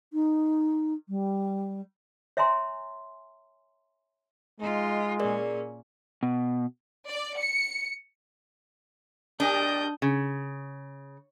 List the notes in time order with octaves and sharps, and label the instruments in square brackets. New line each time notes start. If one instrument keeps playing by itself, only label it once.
[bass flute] D#4
G3
[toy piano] C#5 E5 G#5 A#5 C6
[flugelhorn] G#3 [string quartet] D#4 F4
[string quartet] A#2 C#4 [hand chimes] G#4 A#4 D5
[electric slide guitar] B2
[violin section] D5
C#7
[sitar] B2 G4 A#4 [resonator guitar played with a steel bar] D4 [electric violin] D#6 G6
[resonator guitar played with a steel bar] C#3